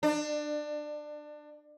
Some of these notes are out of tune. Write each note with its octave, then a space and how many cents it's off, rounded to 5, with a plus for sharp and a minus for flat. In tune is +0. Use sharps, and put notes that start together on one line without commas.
D4 +25